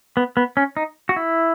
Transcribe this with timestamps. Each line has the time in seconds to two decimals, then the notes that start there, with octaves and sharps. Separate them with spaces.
0.17 B3
0.37 B3
0.57 C#4
0.77 D#4
1.09 F#4
1.16 E4